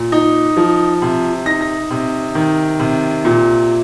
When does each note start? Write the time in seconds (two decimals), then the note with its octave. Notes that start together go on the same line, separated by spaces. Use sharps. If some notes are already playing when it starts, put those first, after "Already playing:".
Already playing: A#2
0.12 D#4
0.57 F3
1.02 C3
1.46 D#4 A#6
1.61 A#6
1.90 C3
2.35 D#3
2.79 C3
3.25 A#2